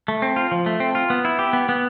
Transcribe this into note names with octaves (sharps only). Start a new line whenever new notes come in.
A3
C4
F4
F3
A3
C4
F4
B3
E4
G4
B3
B3